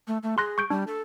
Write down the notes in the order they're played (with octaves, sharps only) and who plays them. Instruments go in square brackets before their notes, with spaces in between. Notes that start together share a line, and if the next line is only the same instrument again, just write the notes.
[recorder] A3
A3
[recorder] G#4 [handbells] C6 F#6 A#6
[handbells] C#6 G6 D7
[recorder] G3 [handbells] D4
[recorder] A4